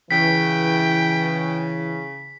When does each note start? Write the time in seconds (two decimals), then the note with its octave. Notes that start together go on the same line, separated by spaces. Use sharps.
0.11 C#3 E3 G5 B6